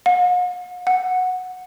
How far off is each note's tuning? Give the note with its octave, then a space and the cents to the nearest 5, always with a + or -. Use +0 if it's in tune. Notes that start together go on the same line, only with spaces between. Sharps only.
F#5 -45
F#5 -10